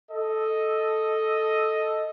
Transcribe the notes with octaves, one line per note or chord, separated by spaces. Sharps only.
A4 D#5